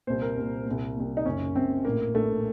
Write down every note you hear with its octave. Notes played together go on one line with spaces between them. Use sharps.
C2 A#2 C5
A#4
C2 A#2
A#2
C2
C2 A#2
D#4
F#1 F#2 C#3 C#4
F#1 F#2 C#3 C4
A#1 A2 A#3
A#1 A2 A3